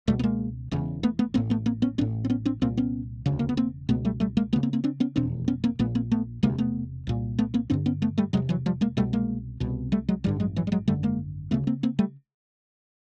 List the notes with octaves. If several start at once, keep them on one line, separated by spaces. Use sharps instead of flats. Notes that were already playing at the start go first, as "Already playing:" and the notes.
C#2 B2 G3 A3
B3
G#3 A#3
E1 E2 C#3
A3 B3
A3 B3
A1 A2 A#3 C4
A3 B3
A#3 C4
B3 C#4
A1 A2 C4 D4
C4
B3 C#4
C4 D4
C2 A#2 A#3 C4
B3 C#4
E1 D2 C#3
A#3
B3
A#3 C4
C#2 B2 A3 B3
G3 A3
G3 A3
G#3 A#3
D2 C#3 A3 B3
A#3 C4
A#3 C4
C4 D4
B3 C#4
F1 E2 B2 C4 D4
B3 C#4
A#3 C4
A#1 A#2 A3 B3
A#3 C4
A3 B3
E1 D2 C3 G#3 A#3
A3 B3
C2 A#2
A3 B3
A#3 C4
A1 G2 D3 C4 D4
B3 C#4
A3 B3
G3 A3
E1 E2 C3 F#3 G#3
E3 F#3
F3 G3
G#3 A#3
C2 B2 G3 A3
G#3 A#3
C2 B2
G3 A3
F#3 G#3
A1 G2 D3 F3 G3
F#3 G#3
E3 F#3
G3
F#3 G#3
G#1 F#2 D3 G3 A3
G#3 A#3
D2 C#3 A3 B3
A#3 C4
A#3 C4
G3 A3